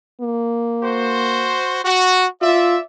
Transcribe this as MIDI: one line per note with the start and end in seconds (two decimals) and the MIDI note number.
0.21 1.60 58
0.83 1.80 66
0.83 1.80 72
1.85 2.26 66
2.42 2.77 65
2.42 2.82 74
2.42 2.82 76